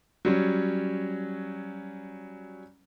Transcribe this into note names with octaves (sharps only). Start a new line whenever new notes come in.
F#3 G3 C#4